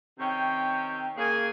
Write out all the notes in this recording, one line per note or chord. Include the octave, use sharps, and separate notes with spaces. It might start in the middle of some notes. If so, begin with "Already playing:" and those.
C3 D#3 C#4 G5
C#3 A#3 G#4 A#4 G#5